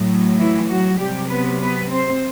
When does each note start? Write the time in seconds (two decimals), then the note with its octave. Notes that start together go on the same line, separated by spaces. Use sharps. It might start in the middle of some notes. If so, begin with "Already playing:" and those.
Already playing: A2 F#3
0.38 E3 E4
0.69 F#3 F#4
0.99 C3 F#3 G3 G4
1.29 B3 B4
1.61 B3 B4
1.90 C4 C5